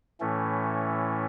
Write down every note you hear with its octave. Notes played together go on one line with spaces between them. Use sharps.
A2 E3 A3 C#4